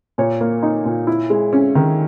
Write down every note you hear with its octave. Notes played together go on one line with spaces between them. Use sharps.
A#2 C#5
A#3
D#4
A#2
E4
G#3
C#4
D#3